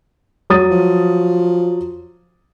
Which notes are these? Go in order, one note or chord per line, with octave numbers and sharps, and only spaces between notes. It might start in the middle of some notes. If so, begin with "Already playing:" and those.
F#3 D#6 A6
F3